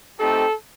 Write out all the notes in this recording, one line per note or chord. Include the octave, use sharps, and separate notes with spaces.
A3 C4 D#4 G4 A4